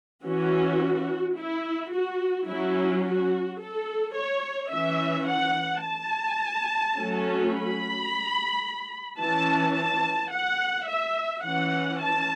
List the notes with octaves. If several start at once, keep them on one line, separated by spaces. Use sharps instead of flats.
E3 C#4 F#4
E4
F#4
F#3 C#4 E4
F#4
A4
C#5
E3 C#4 E5
F#5
A5
F#3 A3 C#4
B5
E3 C#4 A5
A5
F#5
E5
E3 C#4 F#5
A5